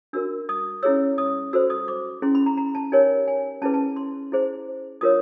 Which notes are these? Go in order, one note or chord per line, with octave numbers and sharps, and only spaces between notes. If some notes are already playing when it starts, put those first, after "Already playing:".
D4 F#4 A#4 E6
D#6
C#4 E4 G#4 C#5 E6
D#6
F#4 A4 C5 E6
D#6
D6
C#4 E4 G#4 C6
B5
A#5
A#5
A5
D#4 G4 A#4 C#5 G#5
G#5
C#4 E4 G#4 B4 A5
A5
C6
E4 G#4 C5
D4 F4 A#4 C#5 D#6